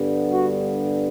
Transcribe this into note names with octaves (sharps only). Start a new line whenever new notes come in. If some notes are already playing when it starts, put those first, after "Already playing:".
Already playing: G2 D3 G3 B3
F#4